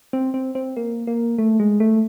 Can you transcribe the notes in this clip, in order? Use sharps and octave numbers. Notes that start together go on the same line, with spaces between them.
C4
C4
C4
A#3
A#3
A3
G#3
A3